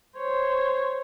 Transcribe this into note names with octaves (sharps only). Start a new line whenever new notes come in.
C5 C#5